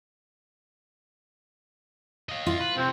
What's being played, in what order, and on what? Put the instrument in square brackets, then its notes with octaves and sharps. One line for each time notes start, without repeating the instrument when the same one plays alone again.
[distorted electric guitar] D#5 F5
[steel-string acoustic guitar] F4
[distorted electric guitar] B4
[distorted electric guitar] C3 F3 [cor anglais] C4